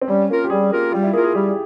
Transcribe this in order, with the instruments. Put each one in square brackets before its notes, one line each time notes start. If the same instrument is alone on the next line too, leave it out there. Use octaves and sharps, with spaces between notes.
[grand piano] C4
[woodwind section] G3 [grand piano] C#4
[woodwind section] A#3 F4 A#4
[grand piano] G4
[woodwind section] G3 [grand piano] G#4
[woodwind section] A#3 F4 A#4
[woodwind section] G3 [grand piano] F4
[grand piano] E4
[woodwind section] A#3 F4 A#4 [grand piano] G#4
[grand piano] G#4
[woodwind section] G3 [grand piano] G4
[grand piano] G#4